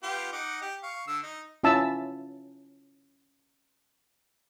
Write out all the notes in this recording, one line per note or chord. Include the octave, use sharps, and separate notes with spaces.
B3 F4 G4
D#4 F#5 D6
G4
F5 C#6
D3 E6
D#4
C#4 E4 F4 E5 A5 E6